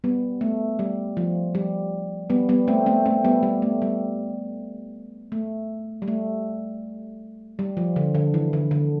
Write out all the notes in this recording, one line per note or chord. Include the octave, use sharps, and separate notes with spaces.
G3 B3
A3
G3
F3
G3
G3 B3
G3 B3
A3 C4
A3 C4
A3 C4
G3 B3
G3
A3
G3
A3
G3
A3
G3
F3
D3
D3
E3
D3
D3